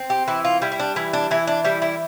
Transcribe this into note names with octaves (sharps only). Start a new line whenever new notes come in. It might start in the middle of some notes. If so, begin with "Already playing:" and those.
Already playing: C4
G4
E3 E4
F4
G3 E4
E4
D4
E3 E4
D4
E3 E4
D4
G3 E4
E4